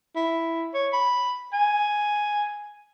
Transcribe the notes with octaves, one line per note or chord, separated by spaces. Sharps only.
E4
C#5
B5
G#5